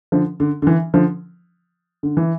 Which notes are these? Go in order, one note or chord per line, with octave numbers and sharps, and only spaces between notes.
D3 F3
D3
D3
E3
D3 F3
D3
E3